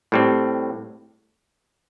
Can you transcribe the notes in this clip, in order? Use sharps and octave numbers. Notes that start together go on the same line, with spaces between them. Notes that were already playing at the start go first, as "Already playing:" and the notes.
A2 G3 C4